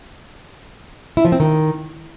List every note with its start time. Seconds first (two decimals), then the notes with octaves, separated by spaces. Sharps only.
1.17 E4
1.25 F3
1.32 C4
1.40 D#3